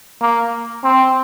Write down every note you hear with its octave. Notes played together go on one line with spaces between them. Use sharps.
A#3
C4